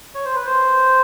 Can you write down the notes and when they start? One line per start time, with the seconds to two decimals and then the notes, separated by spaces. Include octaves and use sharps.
0.15 C#5
0.25 C5
0.35 B4
0.46 C5